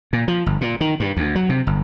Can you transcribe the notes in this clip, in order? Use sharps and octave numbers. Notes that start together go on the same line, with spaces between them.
A#2
F3
G1
A#2
D#3
G2
D2
F#3
C3
G1